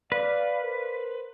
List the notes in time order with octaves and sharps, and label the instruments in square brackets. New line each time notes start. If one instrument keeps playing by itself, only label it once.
[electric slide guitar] B4 [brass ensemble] D5 F5
[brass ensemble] A#4 C5